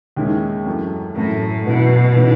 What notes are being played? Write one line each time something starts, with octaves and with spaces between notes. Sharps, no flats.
D#2 D#3 G#3 C#4 E4
F#2 E3 A3
F#2 A2 E3 A3
F#2 B2 E3 B3 E4
C#3 E3 B3 D#4